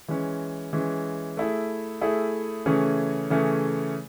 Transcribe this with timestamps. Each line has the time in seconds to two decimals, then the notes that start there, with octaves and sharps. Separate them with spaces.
0.08 E3 G#3 C#4
0.73 E3 G#3 C#4
1.37 A3 E4 G#4
2.01 A3 E4 G#4
2.66 C#3 E3 A3 C#4 G#4
3.30 C#3 E3 A3 C#4 G#4